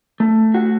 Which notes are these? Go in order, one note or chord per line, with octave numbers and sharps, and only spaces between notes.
A3
F#4